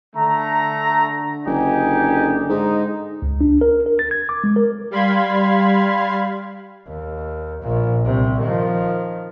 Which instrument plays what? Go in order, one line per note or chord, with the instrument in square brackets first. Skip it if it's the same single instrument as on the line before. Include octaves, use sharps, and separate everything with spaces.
[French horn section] D3 [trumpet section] A3 A#5
[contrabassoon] F#1 [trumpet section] D#4 G4 G#5
[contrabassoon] G#2 [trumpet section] D#4
[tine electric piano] C#2
D4
A#4
A#4
A6
G#6
D6
G#3
A#4
[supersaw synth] G3 F5 B5 C6 G#6
[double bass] D#2
A#1 A#2
C2 C3
D#3 F3